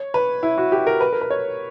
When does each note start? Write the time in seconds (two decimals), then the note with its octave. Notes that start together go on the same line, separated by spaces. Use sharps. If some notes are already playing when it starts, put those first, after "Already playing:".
Already playing: C#5
0.14 B4
0.43 E4
0.58 F#4
0.72 G4
0.87 A#4
1.01 B4
1.13 A#4
1.21 B4
1.30 C#5